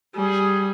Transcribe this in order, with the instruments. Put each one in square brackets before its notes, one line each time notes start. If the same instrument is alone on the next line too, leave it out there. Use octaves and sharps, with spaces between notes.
[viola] G3 [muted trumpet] G#4